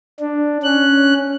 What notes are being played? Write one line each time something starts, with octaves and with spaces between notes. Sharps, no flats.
D4
C#4 F#6